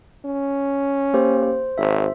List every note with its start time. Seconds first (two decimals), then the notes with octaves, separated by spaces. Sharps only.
0.25 C#4
1.13 A#3 G4 C5
1.43 C5
1.78 G#1 C5 E5